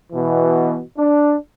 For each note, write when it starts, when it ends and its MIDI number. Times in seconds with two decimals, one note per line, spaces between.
0.12 0.81 47
0.12 0.81 52
0.97 1.35 62